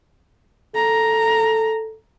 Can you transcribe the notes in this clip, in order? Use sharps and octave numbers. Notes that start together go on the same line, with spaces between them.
A4 A#5